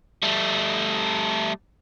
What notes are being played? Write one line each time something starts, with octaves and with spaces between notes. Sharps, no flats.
G3 A3